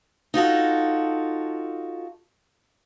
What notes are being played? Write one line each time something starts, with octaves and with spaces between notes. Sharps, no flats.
D#4 F4 F#4 A4